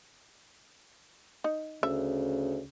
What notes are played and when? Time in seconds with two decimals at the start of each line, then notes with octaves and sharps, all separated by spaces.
1.44 D#4
1.83 D2 C#3 E5